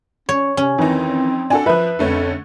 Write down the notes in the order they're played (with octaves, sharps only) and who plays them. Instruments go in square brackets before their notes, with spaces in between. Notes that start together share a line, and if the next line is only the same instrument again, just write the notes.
[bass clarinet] C#4 [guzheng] C#5
[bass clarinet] C3 [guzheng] C#4
[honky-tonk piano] F2 D#4 [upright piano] D#3 E3 [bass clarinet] C4
[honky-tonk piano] D4 F#4 A4 [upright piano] G#5
[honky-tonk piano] F3 F#6 [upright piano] B4 E5 B5
[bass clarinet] F2 [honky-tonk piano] D3 A3 C#4